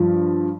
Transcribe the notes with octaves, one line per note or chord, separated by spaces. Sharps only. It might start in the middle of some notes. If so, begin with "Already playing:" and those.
Already playing: G2 F3